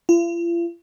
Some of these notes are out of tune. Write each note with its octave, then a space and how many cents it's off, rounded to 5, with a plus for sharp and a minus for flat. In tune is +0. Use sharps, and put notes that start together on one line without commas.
F4 -45